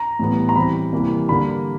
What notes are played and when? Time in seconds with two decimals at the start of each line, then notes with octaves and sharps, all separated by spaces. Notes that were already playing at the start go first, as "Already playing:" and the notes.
Already playing: A#5
0.19 A2 E3 G3 B3
0.49 A#5
0.56 E3 G3 C4 B5
0.93 C3 E3 G3 A#3
1.29 D3 G3 A#3 B5